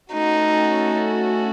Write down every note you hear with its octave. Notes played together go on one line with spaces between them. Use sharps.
A3 C#4 D#4 F#4 A4